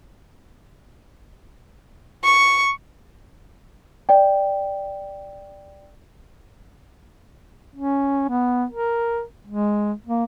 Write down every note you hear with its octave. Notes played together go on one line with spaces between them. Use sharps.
C#6
D5 G5
C#4
B3
A#4
G#3
A#3